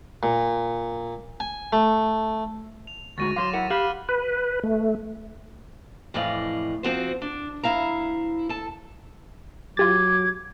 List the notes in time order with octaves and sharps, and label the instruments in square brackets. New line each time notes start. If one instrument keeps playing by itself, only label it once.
[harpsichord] A#2
G#5
A3
[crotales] F7
[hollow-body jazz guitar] D2 G#3 F#4 [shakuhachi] C#6 [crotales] A6 A#6 D#7
[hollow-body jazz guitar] F#3 F5 [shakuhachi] C6 [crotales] D6 A#6 E7
[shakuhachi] E4 [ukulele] A#4 F#5
[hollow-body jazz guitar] G4 [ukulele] F5 [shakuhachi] B5 [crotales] F6 F#6 F#7
[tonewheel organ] B4
A3
[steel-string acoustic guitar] F2 A2 E3 D5 D#5 F5
F3 C4 F#4 C5
D4
D2 G#2 E4 F5 A#5
A4 A5
[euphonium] F#3 [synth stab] F4 G4 A6 [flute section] D6 G#6